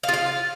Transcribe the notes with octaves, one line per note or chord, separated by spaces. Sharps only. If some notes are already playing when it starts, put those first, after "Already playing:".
F5
F4
F5